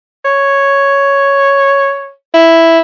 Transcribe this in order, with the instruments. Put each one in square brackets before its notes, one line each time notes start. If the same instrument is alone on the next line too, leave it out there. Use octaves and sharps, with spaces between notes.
[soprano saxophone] C#5
E4